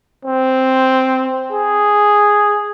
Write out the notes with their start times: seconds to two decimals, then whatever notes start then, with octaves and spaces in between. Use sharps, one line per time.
0.25 C4
1.52 G#4